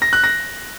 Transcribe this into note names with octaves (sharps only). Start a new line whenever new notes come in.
A#6
F#6
A#6